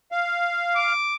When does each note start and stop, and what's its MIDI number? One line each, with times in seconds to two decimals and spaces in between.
0.12 0.93 77
0.76 1.15 86